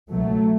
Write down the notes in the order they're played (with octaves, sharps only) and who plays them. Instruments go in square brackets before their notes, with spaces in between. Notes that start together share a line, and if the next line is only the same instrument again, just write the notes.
[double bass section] C#2 B2 F#3 A3